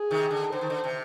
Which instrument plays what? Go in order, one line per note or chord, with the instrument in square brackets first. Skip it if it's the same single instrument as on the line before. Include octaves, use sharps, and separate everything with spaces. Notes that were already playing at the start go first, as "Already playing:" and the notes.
Already playing: [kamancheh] G#4
[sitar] C3 D#3
D3
[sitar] D3 [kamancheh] C5
[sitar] D#3
D3
C3